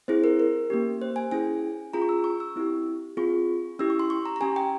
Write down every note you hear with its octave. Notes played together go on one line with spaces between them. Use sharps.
C4 E4 G#4 C5
A#4
A#4
A#3 C#4 G4
C5
G#5
C#4 E4 G#4 G#5
C#4 F4 G#4 A#5
C#6
E6
C#6
E6
C4 E4 G4
C4 F4 G#4 C#6
C#4 E4 G4 E6
C#6
C6
C#6
A#5
A#5
C#4 G4 G#5
G5